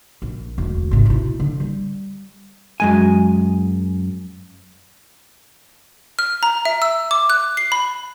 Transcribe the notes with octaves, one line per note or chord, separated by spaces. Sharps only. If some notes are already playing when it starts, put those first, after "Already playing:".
A#1
E1 D2
G#1 C3
B2 E4
D3
G3
F#2 G#3 G#5
F6
A#5
E5
E6
D6
F#6
C7
B5